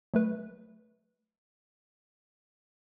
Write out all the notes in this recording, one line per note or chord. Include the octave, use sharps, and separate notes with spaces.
F#3 A3 B4